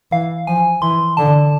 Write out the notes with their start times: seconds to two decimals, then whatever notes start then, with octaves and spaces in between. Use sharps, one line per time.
0.11 E3 F5
0.47 F3 G#5
0.81 E3 C6
1.17 D3 A5